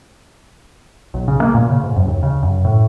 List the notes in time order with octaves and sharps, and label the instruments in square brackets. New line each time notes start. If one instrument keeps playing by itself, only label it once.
[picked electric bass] B1
C#3
A#3
A#2
C#3
G#2
F#2
D#2
C#3
F#2
A2